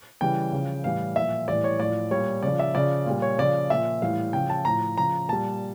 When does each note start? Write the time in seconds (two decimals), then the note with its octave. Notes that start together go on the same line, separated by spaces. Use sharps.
0.21 C#3 E3 G3 G5
0.52 C#3 F3
0.84 A2 E3 G3 F5
1.16 A#2 F3 E5
1.48 A2 E3 G3 D5
1.64 C#5
1.79 A2 F3 D5
2.11 A#2 G3 C#5
2.43 C#3 F3 D5
2.59 E5
2.75 C#3 F3 D5
3.06 A#2 G3
3.22 C#5
3.38 C#3 F3 D5
3.70 A#2 F3 E5
4.02 A2 E3 G3 F5
4.33 C#3 F3 G5
4.50 A5
4.65 A2 F3 A#5
4.97 C#3 F3 A#5
5.28 A#2 G3 A5